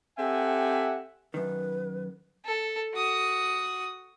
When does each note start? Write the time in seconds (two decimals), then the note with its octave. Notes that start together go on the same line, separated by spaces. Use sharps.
0.18 C4 G4 A4 E5 F#5 G#5
1.34 F#2 D#3 B4
2.45 A4
2.94 F#4 D#6